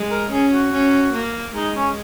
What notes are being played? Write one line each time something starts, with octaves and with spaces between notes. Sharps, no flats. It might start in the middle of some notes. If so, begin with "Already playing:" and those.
Already playing: G#3
A#4
C#4 G#4
F#4
C#4
A#3
G#3 D#4
C#4